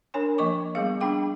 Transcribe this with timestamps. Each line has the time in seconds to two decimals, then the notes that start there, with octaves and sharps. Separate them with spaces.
0.14 D4 A#4 C#5 G#5 C6
0.38 F3 A#3 D#5 C#6 D6
0.75 G3 B3 G#4 F5
1.01 D4 G#4 G5 D6